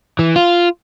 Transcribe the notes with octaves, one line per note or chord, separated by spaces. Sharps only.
E3
F4